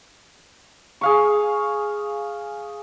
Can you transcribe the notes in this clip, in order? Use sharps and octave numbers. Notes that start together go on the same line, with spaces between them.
G#4 F5 C#6